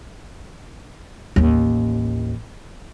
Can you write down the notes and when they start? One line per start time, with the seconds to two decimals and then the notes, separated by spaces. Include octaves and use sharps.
1.36 A1 D#2